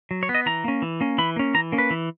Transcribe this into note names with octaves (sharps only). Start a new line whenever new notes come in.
F#3
C#5
B3
D#5
E3 A#5
A#3 C#4
E3
A#3 C#4
E3 B5
A#3 C#4
E3 A#5
A#3 C#4
B4
E3